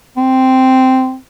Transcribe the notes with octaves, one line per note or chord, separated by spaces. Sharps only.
C4